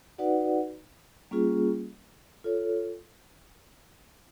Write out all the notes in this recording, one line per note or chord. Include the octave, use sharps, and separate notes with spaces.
D#4 F#4 B4 D5 F#5
G3 A#3 C#4 F4 G#4
F4 A4 C#5